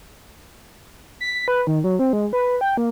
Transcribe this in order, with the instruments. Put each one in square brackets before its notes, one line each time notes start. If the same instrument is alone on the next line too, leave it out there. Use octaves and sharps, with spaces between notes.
[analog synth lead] B6
B4
D#3
F#3
C4
G#3
B4
G5
A#3